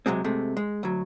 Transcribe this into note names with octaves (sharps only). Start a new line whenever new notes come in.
C3 D#3 F#3 G#3 C4
C3 G#3 A3
G#3
D2 F#3